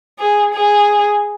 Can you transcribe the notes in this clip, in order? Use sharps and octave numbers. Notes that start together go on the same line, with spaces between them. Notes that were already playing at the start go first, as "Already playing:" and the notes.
G#4
G#4